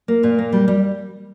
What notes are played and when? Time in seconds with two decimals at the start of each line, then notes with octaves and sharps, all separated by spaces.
0.08 A#3
0.23 A#2
0.39 A#3
0.53 G3
0.68 G3